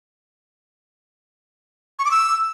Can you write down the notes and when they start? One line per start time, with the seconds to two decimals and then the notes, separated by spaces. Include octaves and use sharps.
1.99 C#6
2.05 D6
2.11 E6